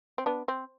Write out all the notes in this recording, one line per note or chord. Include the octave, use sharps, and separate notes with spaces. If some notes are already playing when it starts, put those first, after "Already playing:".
C4
B3 D4
C4